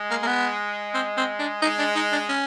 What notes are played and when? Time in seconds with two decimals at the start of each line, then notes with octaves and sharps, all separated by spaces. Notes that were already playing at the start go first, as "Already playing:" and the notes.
Already playing: G#3
0.10 A#3
0.23 A#3
0.27 B3
0.94 C4
1.17 C4
1.39 D4
1.62 G#3 D#4
1.79 D4
1.95 D#4
2.12 D4
2.29 C#4